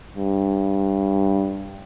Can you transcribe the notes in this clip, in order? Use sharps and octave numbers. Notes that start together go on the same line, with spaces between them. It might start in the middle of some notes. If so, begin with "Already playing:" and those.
G2